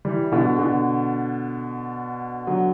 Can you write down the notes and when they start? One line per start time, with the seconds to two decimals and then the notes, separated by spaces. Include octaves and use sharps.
0.05 E3 G3
0.24 E3
0.32 B2 D3
0.59 B2 D3
2.47 D3 F#3